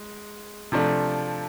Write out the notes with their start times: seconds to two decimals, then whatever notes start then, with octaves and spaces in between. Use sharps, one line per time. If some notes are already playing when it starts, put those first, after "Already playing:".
Already playing: G#3
0.72 C3 F3 A3 D4